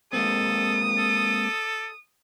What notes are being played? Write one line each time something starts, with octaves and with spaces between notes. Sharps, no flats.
G#3 A#3 C4 A4 D#6
A4